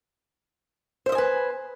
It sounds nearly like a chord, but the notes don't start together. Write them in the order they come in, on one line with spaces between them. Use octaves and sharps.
C5 E5 D#5 G#5 B4